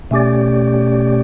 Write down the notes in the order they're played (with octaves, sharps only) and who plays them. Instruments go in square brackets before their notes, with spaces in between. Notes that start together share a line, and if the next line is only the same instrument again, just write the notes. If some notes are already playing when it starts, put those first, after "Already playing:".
[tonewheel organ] B2 A3 C#4 G4 D5